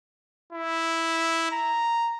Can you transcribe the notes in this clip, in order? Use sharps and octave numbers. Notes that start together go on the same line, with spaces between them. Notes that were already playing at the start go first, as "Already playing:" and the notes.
E4
A#5